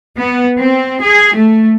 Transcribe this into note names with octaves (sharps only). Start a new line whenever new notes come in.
B3
C4
G#4
A3